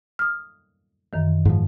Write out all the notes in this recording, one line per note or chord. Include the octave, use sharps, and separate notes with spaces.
D#6 F6
F#2 D#3 E3
G#2 F3